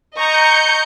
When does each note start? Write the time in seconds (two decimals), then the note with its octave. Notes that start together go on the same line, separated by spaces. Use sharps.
0.15 D#5 A#5 C#6 G6 C#7